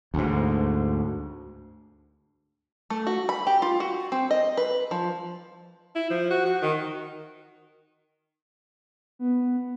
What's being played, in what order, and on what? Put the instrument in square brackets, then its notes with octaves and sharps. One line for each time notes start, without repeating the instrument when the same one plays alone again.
[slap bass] D2 G#2
[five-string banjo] A3
F#4
B5
G4
F4
F#4
C4
D#5
B4
F3
[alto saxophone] E4
F3
F#4
F#4
D#3
[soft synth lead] B3